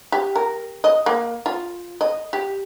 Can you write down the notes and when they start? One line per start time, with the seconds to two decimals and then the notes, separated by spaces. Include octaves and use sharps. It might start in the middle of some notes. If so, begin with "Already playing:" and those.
0.12 G4
0.36 A#4
0.84 D#5
1.06 A#3
1.46 F4
2.01 D#5
2.33 G4